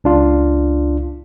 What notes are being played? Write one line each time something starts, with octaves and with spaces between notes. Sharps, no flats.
C#2 D4 F4